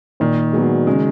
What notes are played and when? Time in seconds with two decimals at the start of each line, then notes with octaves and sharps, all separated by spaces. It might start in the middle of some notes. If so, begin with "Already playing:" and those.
0.20 A#2 D#3
0.53 F#3 G#3 B3 F#4
0.87 C#3 G#3